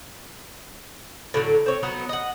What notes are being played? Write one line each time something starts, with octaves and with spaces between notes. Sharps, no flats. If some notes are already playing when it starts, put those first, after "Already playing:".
A2 D3 F#3
C4 C#5
F#3 B3 D#4
D#5 F#5